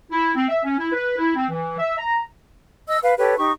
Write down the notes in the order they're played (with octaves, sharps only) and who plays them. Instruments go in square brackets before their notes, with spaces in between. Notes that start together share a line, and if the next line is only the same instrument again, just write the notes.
[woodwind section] E4
C4
E5
C#4
E4
B4
E4
C4
E3
E5
A#5
[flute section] D#5 E6
B4 F5
G4 A4 B4 C#5
D#4 G4 C#6